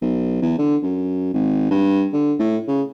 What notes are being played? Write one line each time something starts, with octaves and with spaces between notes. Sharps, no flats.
B1
E2
D3
F#2
G#1
G2
D3
A2
C#3